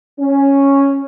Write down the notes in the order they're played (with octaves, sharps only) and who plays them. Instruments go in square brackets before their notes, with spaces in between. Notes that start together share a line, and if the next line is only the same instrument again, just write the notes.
[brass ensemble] C#4